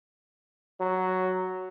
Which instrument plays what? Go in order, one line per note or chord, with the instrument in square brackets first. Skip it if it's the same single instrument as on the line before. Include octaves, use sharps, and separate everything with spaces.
[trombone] F#3